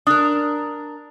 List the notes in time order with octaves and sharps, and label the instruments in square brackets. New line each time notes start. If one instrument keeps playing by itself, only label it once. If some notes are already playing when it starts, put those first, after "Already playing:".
[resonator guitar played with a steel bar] D4 A#4 [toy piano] D#6